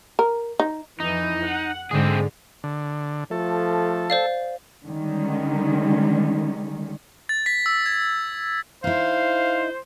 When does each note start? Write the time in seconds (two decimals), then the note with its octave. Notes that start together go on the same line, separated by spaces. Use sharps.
0.19 A#4
0.60 D#4
1.00 F2 E3 D#4
1.44 F#5
1.91 G#2 D3 G#3 C4 G#4
2.64 D3
3.31 F3 A3 A4
4.10 C5 D5 F5
4.85 D3 D#3 G3 G#3 C#4
7.29 A6
7.46 B6
7.66 E6
7.86 G#6
8.84 D#4 E4 C5 F5